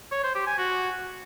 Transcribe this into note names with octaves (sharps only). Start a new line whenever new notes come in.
C#5
C5
G4
G#5
F#4